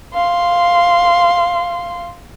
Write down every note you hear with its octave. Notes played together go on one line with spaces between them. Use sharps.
F5 C6